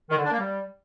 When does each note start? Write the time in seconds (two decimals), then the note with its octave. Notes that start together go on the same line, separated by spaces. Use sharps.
0.10 D#3
0.17 D3
0.25 D4
0.32 A#3
0.39 G3